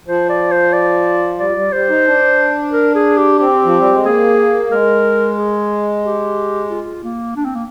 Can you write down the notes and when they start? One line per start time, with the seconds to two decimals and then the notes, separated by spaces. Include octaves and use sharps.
0.07 F3 C5
0.29 D5
0.51 C5
0.73 D5
1.39 G3 D5
1.56 G3
1.72 G3 C5
1.89 D#4
2.06 D4
2.72 A#4
2.95 G#4
3.17 G4
3.38 C4 G4
3.65 F3
3.79 G3
3.92 G#3
4.05 A#3 G#4
4.71 G#3 A#4
5.38 G#4
6.04 G4
6.70 F4
7.04 A#3
7.36 D4
7.45 C4
7.55 A#3